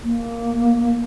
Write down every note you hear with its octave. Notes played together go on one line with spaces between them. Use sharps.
A#3